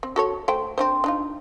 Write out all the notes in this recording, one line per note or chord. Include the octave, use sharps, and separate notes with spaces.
C4
F#4 A4 C#5
A3 C5 G5
C4 D4 C5
D4 D#4 F4